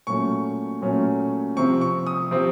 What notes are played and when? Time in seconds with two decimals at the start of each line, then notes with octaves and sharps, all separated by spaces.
0.07 A#2 F#3 A3 C#4 C#6
0.82 A#2 F#3 A3 C#4
1.57 C3 F3 C4 C#6
1.81 C#6
2.07 D#6
2.31 C3 F3 C4